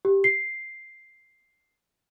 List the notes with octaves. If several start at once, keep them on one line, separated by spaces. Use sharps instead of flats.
G4
C7